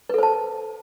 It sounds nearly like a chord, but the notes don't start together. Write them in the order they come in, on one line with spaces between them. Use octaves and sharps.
B4 A4 C5 A5